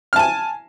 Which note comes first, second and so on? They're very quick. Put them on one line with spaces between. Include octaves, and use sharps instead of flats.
F6 A5 G#5